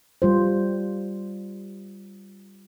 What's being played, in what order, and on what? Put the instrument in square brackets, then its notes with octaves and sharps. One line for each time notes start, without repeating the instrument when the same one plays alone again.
[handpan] G3 F4 C5